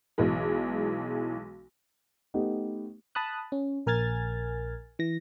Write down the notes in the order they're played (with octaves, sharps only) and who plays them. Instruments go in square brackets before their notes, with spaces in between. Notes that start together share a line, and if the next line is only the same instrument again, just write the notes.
[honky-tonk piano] B1 E3 G#3
[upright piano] A3 B3 D#4 G4
[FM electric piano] A5 B5 D#6 F#6
C#4
A#1 A#4 G#5 F6 G#6 A6
E3 A#6